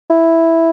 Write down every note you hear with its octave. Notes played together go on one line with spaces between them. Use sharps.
E4